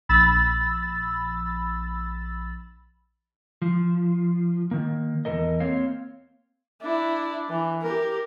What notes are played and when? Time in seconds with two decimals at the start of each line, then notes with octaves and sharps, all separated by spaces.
0.09 A#1 B5 E6 A6
3.62 F3
4.71 D#3 A#3
5.25 E2 G3 A4 A#4 D#5
5.60 A#3 C4 C#5 F5
6.82 D4 E4
7.49 E3
7.82 G4 A#4